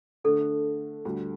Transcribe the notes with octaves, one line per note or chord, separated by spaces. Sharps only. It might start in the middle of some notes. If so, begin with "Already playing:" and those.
D3 A3 D4 A4
D2 D3 G3